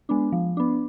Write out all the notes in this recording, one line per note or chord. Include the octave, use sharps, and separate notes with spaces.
G#3 B3 D4
F3
B3 D4